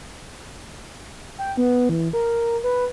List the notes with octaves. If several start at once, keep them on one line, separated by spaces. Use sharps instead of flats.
G5
B3
E3
A#4
B4